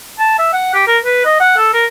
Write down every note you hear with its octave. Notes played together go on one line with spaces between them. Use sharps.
A5
E5
F#5
G4
A#4
B4
D#5
F#5
A4
A#4